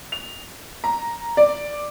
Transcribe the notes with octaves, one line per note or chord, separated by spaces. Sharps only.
F7
A#5
D5